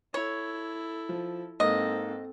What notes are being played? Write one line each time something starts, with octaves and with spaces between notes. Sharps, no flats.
E4 A4 C#5
F3
G#2 A#3 C4 A4 D#5